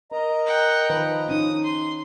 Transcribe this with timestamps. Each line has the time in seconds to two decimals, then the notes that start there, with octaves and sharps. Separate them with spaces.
0.12 A#4 D#5 A#5
0.46 F#5 G5
0.89 D#3 F3 B4
1.29 C#4 D#4 D#6
1.64 C6